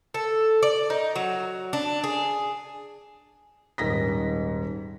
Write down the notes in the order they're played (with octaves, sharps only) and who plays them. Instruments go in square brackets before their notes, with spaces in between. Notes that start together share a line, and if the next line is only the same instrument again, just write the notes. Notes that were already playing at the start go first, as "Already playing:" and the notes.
[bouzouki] A4
D5
D#4
F#3
D4
G#4
[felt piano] D#1 G#2 A#6 B6